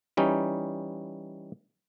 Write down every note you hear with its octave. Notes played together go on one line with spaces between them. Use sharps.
E3 G3 C#4 D#4